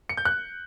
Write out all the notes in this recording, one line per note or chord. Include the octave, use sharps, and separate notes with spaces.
C#7
G6
F#6